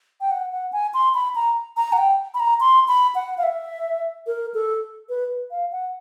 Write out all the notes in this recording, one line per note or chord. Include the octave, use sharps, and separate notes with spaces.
G5
F#5
F#5
G#5
C6
B5
A#5
A#5
F#5
G5
B5
A#5
C6
B5
F#5
F5
E5
A#4
A4
B4
F5
F#5